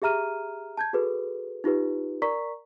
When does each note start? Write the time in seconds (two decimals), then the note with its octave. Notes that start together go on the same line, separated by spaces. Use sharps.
0.02 G4 G#4 E5 A#5 F6 D#7
0.77 A5 G6 G#6
0.93 F#4 G#4 A4 B4
1.64 D#4 F4 G4 B4
2.22 A#4 D5 A#5 C#6 B6